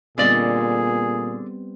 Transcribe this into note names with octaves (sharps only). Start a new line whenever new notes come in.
A#2 D3 G3 B3 C4 G#4 D5 D#5